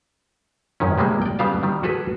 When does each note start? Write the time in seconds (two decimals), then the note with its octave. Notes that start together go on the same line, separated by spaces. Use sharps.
0.80 F#2 D#3 C#4
0.98 C3 G3 G#3 A#3
1.22 D5 G5
1.39 C#3 G3 B3 F5 A5
1.63 D#3 G3
1.83 F#4 G#4 A4 B4